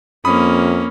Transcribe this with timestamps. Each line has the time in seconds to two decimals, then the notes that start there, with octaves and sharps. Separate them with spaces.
0.25 F2 A#3 C#4 B5 D#6